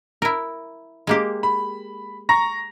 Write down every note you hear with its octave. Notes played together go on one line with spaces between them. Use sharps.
E4 A#4
G#3 A#3 G4
B5
A#5 C#6 A#6